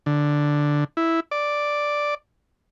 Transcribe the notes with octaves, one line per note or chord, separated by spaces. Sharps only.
D3
E4
D5